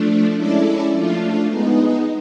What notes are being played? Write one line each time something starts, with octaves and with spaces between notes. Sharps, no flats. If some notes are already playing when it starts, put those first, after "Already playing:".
Already playing: F3 A3 D4
G#3 C#4 E4 A4 D5
F3 A3 D4 F4
G#3 B3 D#4